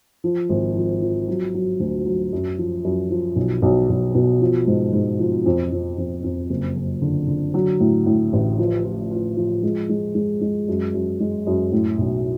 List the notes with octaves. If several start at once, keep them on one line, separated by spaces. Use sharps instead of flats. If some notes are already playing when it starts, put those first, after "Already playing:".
F3
G#1
F3
F3
F#3
F#3
D2
F#3
F#2
F3
F#2
F3
B1
B1
B1
B2
F3
G#2
G#2
F3
F2
F2
F2
F2
F#1
F#1
D3
D3
F#3
A2
A2
A1
F3
F4
F4
F3
G#3
G#3
G#3
G#3
F#2
F#2
G#3
F#2
A2
B1